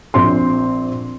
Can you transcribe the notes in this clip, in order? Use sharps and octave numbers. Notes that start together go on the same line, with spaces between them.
A#1 C4 C6